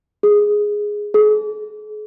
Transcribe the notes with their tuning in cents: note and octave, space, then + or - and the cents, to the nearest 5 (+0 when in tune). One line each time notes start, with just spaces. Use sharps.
G#4 +0
G#4 +40